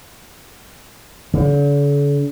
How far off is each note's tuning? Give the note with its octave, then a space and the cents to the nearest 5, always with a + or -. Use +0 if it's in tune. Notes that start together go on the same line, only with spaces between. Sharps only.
D3 -45